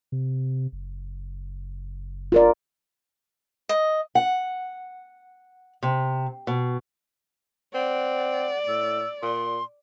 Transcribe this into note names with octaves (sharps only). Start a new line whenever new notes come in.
C3
F#1
F4 A#4 D5
D#5
F#5
C3
B2
C4 D5 F#5
A2 E6
A#2 C6